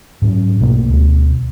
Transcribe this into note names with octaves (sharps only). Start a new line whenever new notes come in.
G#2 F#3 C#4
B1 B2 A3 A#3
D2 B2